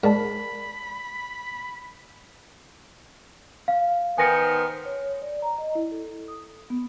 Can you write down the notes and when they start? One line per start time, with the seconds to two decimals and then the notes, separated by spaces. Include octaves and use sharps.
0.04 G#2 A#4 D5 A5 B5
3.68 F5
4.18 D#3 B3 C5 G#5 A#6 C#7
4.85 C#5
5.22 D5
5.42 A#5
5.58 D#5
5.75 E4
5.92 A4
6.28 D#6
6.70 B3